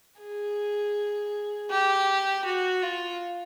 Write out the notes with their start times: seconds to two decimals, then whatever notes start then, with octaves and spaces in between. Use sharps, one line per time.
0.21 G#4
1.71 G4
2.44 F#4
2.82 F4